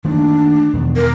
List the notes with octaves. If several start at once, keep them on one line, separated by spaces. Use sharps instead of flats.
D#3 A3 A#3 D4
E2 B2 D#3
A#4